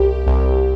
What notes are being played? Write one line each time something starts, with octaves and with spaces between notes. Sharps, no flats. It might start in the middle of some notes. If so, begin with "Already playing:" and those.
Already playing: C2 G4
C2